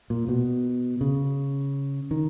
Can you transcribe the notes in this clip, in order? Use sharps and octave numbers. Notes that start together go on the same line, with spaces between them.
A#2
B2
C#3
D#3